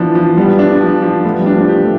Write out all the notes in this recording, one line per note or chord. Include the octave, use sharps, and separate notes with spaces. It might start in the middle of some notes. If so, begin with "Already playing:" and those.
Already playing: E3 F3 B3 D4
F3
G3 B3
D4
F3
F3
A3 B3
G3
D4
F3
G4
A3